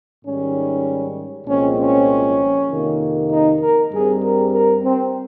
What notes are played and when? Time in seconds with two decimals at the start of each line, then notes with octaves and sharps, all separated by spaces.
0.24 G#2 D#3 G3 C#4
1.47 C2 A#2 F3 G#3 C4 C#4
1.77 C#4
2.69 F2 C3 D#3 A#3
3.30 D#4
3.60 A#4
3.91 G2 G3 C4 G#4
4.22 A#4
4.52 A#4
4.83 C4